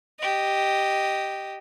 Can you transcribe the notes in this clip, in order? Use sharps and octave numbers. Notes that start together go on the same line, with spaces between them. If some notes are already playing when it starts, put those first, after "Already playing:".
G4 D#5